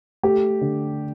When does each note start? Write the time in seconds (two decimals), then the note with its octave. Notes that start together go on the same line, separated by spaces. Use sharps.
0.23 A3 G4
0.61 D3